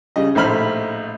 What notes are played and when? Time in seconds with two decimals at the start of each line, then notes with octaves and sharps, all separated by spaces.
0.16 C#3 G3 D#5
0.35 A#1 A2 D#4 C5 B5 F6